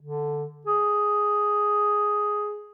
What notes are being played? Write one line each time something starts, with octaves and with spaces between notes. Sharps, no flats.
D3
G#4